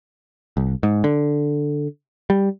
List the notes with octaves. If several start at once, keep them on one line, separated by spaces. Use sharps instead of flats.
C2
G#2
D3
G3